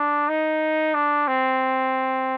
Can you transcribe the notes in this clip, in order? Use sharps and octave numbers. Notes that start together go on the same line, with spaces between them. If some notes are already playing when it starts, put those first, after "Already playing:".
Already playing: D4
D#4
D4
C4